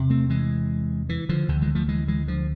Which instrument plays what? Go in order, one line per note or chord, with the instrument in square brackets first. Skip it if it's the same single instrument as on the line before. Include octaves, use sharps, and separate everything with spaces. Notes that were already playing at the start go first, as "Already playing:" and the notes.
Already playing: [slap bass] E2 C3
A3 C4
E3 G#3
E3
D3 F3
D2 D3
E3 G#3
F3 A3
E3 G#3
E3 G#3
D3 F3